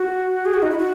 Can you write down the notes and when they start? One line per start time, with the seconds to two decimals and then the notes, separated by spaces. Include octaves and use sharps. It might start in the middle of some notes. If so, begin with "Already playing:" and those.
Already playing: F#4
0.45 G#4
0.54 F#4
0.62 D#4
0.71 E4
0.78 F#4